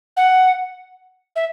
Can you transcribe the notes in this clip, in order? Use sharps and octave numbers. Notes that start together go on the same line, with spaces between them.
F#5
E5